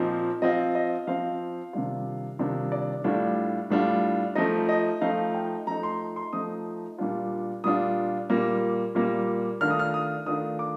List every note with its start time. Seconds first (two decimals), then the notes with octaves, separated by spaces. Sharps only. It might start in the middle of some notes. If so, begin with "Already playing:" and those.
Already playing: A#2 F3 C4 D#4
0.42 F3 C4 F4 D#5
0.75 D#5
1.07 F3 C4 F4 F5
1.73 C3 D#3 G3 D4 F4
2.39 C3 D#3 G3 D4 F4
2.72 D5
3.04 A2 G3 D4 F4
3.70 A2 G3 D4 F4
4.35 F3 A3 D#4 D#5
4.69 D#5
5.01 F3 A3 D#4 F5
5.35 G5
5.67 F3 A3 D#4 A#5
5.83 C6
6.16 C6
6.33 F3 A3 D#4 D#6
6.98 A#2 G3 D4 F4
7.64 A#2 G3 D4 F4 D#6
8.30 A#2 G3 A#3
8.95 A#2 G3 A#3
9.61 D#3 A3 D4 F4 F6
9.70 D#6
9.79 F6
9.94 D#6
10.26 D#3 A3 D4 F4 D#6
10.59 D6